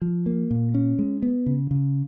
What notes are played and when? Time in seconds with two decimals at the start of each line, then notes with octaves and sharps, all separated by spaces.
0.02 F3
0.26 A#3
0.51 A#2
0.74 C#4
0.99 G#3
1.22 B3
1.46 C#3
1.71 C#3